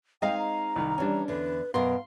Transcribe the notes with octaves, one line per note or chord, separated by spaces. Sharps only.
G#3 C4 D#4 D#5 F5 G5
A#5
C2 D#3
E3 G3 C#4 D4
E2 D3 B4
F#2 B2 B3 A#4 F5 C6